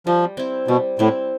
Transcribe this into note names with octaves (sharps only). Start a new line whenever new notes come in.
F3 G3
C4 E4
B2 G3
A2 C4 E4